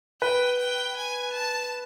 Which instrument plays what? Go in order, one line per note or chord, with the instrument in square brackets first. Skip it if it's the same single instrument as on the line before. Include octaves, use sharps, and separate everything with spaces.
[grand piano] B4 [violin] G5
[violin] G5
G#5
A5